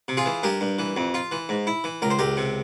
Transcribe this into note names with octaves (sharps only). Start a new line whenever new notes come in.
C3
F4 G#4
E3
G2 G4 A#4
G2
E3
F2
F4
E3
G#2
E4
E3
C#2 A#4
C5
C#2 G4 A#4
C3